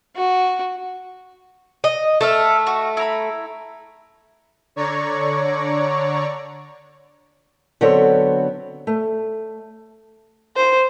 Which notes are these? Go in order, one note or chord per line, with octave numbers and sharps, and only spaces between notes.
F#4
D#5
A3 A4 E5 F5
F#4
E4 A#5 B5
D3 C#5 D5 A#5 C#6
D3 F#3 B3 C4 A4 C#5
A3
C5